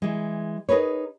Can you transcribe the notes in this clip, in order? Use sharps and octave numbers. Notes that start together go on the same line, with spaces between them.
E3 G#3
D#4 G#4 A#4 B4 C#5